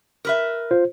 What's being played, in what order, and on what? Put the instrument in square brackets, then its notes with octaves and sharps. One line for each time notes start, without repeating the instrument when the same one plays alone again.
[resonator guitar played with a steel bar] A#4 B4 E5
[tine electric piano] F4 C5